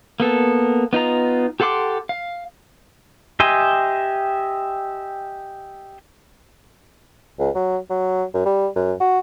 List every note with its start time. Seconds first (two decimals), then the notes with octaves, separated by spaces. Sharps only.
0.20 A#3 B3 A4
0.93 B3 D#4 F4 A#5
1.60 G4 A4 F#5 C6 D6
2.09 F5
3.40 G4 D#5 E5 G#5 C6
7.39 C#2
7.55 F#3
7.90 F#3
8.34 F#2
8.45 G3
8.75 F#2
9.00 F#4